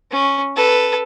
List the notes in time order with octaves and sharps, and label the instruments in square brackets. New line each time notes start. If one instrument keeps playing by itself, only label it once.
[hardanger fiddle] C#4
A4 B4